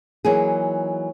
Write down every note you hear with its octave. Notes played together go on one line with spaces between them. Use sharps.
E3 F#3 A#3 D#4 G#4